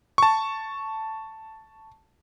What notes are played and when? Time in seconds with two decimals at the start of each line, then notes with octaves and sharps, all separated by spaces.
0.18 A5 C#6